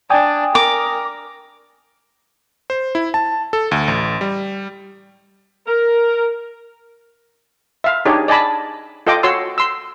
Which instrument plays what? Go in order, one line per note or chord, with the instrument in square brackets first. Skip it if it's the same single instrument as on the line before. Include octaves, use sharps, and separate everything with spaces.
[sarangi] D4 [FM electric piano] G5 G#5 D#6
[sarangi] A#4 [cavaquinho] D6
[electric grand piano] C5
E4
A5
A4
D2
A1
G3
[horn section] A#4
[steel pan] E5 F5
D4 D#4 G4 G#4 C#5
D5 D#5 G#5 A5 B5
F4 A4 D#5 G5 D6
F#4 C#5 C6 E6
C6 E6